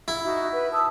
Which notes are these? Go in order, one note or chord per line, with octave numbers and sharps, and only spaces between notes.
E4
D#4 F#4 E5
B4
A5 D#6 E6